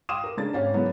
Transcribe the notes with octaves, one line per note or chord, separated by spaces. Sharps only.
F5 G5 C6 D6 D#6 E7
A#4
C#3 A#3 D4 A6
G#1 C#4 F5
F#2 C#3 E3 A#3 B3 C#4